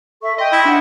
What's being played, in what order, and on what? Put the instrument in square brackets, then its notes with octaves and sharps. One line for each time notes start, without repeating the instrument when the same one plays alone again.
[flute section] A4 E5 C#6
[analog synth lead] D#5 [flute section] E5 G5 C6
[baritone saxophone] E4
[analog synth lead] D4 [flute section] F#5